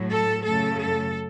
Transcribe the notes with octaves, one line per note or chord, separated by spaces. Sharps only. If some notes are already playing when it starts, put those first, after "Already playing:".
Already playing: A2 F#3 A3
A4
F#2 C#3 F#3 A3 A4
A4